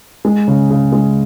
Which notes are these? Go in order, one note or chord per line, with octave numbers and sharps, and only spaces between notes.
G#3
C#3
C#3
G#3